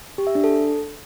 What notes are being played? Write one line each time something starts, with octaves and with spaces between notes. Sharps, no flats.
G4
E5
D4
A4